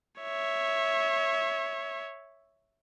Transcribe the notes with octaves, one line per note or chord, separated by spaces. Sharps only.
C#5 E5